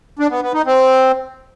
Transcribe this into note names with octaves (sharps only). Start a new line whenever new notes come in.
D4
B3
B3
D#4
C4